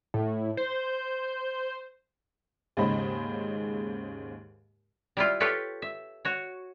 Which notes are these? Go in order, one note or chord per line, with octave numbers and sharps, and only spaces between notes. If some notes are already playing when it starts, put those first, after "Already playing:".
A2
C5
D#2 G#2 C#3 C5 D#5 B5
G3 E4 F4
F4 G4 A4 B4 C#5
E5
F#4 C#5